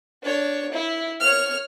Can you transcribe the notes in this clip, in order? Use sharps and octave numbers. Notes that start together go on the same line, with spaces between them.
D4 C#5
E4
C#5 F6